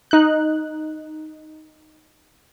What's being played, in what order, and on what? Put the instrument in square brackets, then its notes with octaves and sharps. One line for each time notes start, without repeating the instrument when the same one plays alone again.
[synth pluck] D#4 F#6